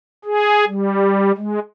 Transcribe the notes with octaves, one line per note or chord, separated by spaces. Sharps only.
G#4
G3
G#3